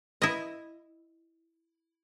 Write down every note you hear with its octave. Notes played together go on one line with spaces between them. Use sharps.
E4 D#5